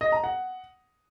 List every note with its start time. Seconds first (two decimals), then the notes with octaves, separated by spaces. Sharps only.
0.01 D#5
0.12 A#5
0.24 F#5